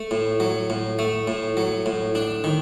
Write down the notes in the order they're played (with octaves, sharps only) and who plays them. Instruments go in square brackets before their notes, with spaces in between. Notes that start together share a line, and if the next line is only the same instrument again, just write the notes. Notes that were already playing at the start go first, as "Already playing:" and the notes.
Already playing: [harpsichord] A3
A2
F#3
A2
A3
A2
F#3
A2
D4
D#3